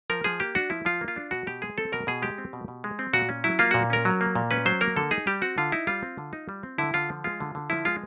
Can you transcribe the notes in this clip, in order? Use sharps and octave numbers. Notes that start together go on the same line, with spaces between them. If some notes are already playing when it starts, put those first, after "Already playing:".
F3 A#4
F3 G#4
A#3 G4
D4 F#4
F3 E4
F3 F4
A#3
F4
D4
B2 F#4
B2 G4
G#3 G#4
C4 A4
B2 A#4
B2 G#4
G#3 G4
C4
B2
B2
G#3
C4
A#2 F#4
C#4
F#3 E4
A#3 F4
A#2 F#4
C#4 A#4
F#3
A#3
A#2
C#4 B4
F#3 C5
A#3 A#4
D3 A4
D#4 G#4
G3 G4
C4 F#4
D3 F4
D#4 E4
G3 F4
C4
D3
D#4
G3
C4
D3 E4
D3 F4
F3
G#3 F4
D3
D3
F3 E4
G#3 F4